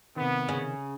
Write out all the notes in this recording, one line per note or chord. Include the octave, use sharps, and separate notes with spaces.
C3 D#3 B3
C#3